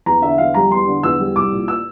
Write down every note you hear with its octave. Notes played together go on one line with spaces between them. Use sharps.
E2 A#5
D3 E5
E2 F5
G3 A#5
E2 C6
D3
E2 E6
G3
C2 D6
A#2
E6